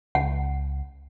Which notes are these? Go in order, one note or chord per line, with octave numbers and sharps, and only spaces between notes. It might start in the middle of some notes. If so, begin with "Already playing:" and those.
C#2 F#5